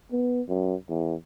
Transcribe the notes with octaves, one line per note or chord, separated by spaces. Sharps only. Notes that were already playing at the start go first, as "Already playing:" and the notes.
B3
F#2
E2